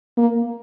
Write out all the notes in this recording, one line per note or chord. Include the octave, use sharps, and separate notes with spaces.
A#3